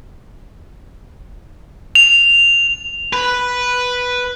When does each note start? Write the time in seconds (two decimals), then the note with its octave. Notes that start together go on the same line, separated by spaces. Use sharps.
1.95 F7
3.13 B4